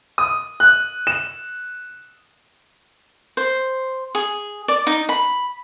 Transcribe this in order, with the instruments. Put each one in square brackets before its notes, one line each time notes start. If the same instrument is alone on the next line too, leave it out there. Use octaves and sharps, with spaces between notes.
[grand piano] D#6
F#6
E7
[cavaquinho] C5
G#4
D5
D#4
B5